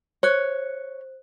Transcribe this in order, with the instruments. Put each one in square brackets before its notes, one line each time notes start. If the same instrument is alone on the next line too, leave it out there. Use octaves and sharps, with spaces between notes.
[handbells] C5 F#6 [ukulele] C#5